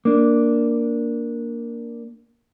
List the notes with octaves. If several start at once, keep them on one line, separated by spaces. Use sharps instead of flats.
A#3 D4